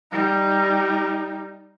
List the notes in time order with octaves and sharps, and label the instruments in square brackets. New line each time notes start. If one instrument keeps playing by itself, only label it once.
[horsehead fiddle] G3 D#4